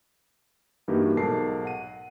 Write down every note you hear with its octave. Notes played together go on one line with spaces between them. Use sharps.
G2 E3 A#3 D#4 F#4 G4
B1 G#2 A4 A#4 A5 C7
F#5 D#7